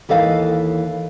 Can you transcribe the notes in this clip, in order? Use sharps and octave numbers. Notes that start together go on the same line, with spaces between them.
D#2 E3 A4 D#5 F5